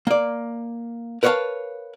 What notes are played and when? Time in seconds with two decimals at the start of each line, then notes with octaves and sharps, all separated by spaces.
0.07 A#3 D5
1.23 A#4 B4 C#5 D#5 F5 A5